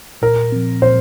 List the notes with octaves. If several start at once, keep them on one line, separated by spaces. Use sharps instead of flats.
A#2 A#4
F3 C4
A#2 C5